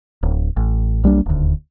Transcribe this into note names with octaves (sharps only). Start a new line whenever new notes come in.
D1
A1
B1 G3 A#3 D4
D#1 D2